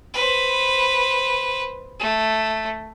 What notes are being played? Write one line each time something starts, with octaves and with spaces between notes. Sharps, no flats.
B4 C5
A3